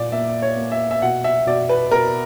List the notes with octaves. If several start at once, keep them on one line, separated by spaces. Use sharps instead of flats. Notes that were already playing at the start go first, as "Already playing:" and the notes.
Already playing: A#2 A#3 D5
A#3 E5
C#5
A#3
E5
E5
B2 F#5
E5
B2 D5
B4
B2 A#4